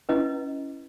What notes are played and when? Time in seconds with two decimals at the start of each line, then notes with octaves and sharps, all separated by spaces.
0.09 C#4 E4 B4 D#5